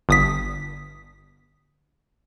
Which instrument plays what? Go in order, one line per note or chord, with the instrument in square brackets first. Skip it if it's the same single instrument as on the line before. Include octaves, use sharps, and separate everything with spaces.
[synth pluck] G1 D#6 B6